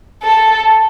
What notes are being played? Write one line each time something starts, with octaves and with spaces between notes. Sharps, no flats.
A4